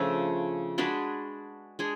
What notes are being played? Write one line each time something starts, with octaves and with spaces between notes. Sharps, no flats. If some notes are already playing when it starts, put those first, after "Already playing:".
Already playing: C#3 F3 A3 D4
G#3 D4 F#4 B4
G#3 D4 G#4